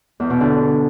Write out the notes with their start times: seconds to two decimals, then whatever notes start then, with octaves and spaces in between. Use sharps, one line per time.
0.20 E2
0.30 B2
0.40 D3